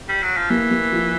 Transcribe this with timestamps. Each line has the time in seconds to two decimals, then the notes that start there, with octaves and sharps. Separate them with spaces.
0.09 G3
0.23 F#3
0.37 F3
0.50 E3 A#3
0.71 A#3
0.92 F3